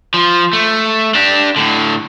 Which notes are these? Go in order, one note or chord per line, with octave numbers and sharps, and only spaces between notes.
F3
A3
D4 G4
A2 D3